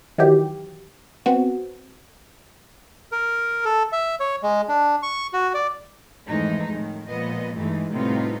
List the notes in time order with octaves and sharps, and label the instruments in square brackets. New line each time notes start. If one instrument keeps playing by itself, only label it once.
[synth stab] D#3 E3 F#3 G4
B3 C4 F#4
[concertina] A#4
A4
E5
C#5
G#3
D4
C#6
F#4
D5
[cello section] F2 G#2 E3 G#3 A3 D#4
A2 D#3
A#2 F3 G#3 B3 D#5
G2 E3 G#3 A3 D#4
A2 C3 G3 B3 D#4 F4